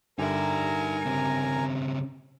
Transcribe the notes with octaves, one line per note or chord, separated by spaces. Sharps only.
G2 D3 D#4 A#4 E5 G#5 A#5
C#3 C4